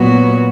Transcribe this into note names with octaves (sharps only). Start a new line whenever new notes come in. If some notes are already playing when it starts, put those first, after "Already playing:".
Already playing: A#2 F#3 B3 F#4